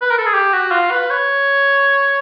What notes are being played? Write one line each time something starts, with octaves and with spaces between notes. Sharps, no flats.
B4
A#4
A4
G#4
G4
F#4
F4
B4
C#5